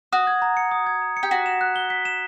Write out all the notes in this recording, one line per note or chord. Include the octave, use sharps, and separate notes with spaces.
F#4 D#6
G#6
A#5
C#7
D#6
G#6
A#5
C#7
G4
F#4 B6
E7
F#6
G7
B6
E7